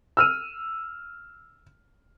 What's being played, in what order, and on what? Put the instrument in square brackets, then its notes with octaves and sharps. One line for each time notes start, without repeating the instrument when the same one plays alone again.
[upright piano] E6 F6 D#7